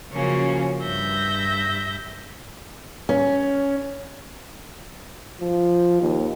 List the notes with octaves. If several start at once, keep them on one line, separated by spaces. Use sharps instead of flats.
C#3 F3 F#3 A#3 C#4
G2 E5 G6 A#6
C#4
F3
D#2